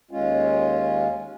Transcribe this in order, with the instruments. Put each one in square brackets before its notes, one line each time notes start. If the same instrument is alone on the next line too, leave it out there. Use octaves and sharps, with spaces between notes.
[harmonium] D#2 G#3 C#4 F4